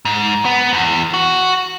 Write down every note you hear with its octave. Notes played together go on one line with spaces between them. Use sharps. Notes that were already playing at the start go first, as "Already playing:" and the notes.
G#2
B3
E2
F#4